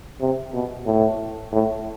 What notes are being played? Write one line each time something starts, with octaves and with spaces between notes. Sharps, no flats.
C3
B2
A2
A2